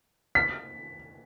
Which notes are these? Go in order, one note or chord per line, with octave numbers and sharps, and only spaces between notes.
B6